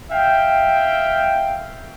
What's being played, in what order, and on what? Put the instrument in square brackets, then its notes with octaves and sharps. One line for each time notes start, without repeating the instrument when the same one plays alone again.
[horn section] E5 F5 G5